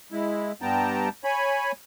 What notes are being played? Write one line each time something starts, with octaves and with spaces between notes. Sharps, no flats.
G#3 E4
G2 G3 B3 G5 A5 A#5
C#5 G#5 B5